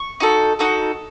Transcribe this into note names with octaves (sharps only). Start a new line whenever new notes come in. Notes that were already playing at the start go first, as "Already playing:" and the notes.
Already playing: C#6
D#4 F#4 A4
D#4 F#4 A4